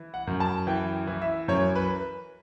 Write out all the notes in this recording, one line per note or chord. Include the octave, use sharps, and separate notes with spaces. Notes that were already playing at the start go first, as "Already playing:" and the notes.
Already playing: E3
F#5
F#2
A5
E3 G5
E3
E5
F#2 C#5
B4